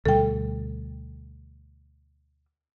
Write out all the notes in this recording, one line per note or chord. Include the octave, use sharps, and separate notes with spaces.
D2 B2 G3 A4 G5